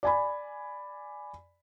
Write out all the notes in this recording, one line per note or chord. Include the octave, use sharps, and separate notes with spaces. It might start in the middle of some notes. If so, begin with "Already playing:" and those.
D5 G#5 B5